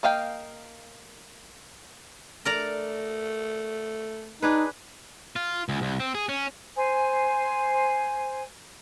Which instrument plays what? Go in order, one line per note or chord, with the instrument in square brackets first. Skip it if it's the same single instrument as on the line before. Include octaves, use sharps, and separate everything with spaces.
[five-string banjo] A#3 D#5 F5 G5
[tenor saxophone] A3 [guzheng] A#4 D5 A#5
[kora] D4 G#4 B4 [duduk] D#4
[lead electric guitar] F4
C#2
C2
C4
G#4
C#4
[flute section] C5 G#5